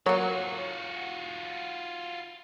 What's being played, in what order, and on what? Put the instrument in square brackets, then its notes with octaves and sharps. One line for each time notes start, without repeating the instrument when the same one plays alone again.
[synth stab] F#3 [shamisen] A#3 C#5 [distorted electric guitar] F4 F#4